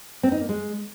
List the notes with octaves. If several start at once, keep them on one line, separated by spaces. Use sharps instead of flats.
C4
D#4
A#3
G#3